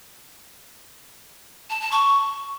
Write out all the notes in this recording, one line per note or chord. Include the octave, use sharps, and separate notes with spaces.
A5
A5
C#6